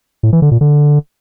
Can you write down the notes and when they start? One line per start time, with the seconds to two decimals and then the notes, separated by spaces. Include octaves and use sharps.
0.23 A2
0.33 E3
0.42 D3
0.51 A#2
0.61 D3